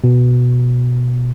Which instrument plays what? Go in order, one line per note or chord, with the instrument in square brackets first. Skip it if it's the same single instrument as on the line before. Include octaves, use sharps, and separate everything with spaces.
[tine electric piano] B2